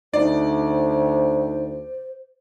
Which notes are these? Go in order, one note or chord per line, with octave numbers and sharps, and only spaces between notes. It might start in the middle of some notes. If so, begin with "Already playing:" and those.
D2 D#4 C5 D5